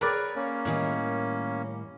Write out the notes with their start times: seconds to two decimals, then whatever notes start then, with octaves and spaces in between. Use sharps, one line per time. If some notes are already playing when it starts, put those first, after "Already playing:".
0.01 G#4 A#4 B4 C#5 D5 G5
0.36 A#3 C#4
0.65 A2 D#3 G3 G#4